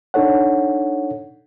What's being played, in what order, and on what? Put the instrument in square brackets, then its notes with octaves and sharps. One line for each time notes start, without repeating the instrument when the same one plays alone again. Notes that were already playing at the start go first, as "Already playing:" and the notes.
[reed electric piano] D4 D#4 A4 C#5 F#5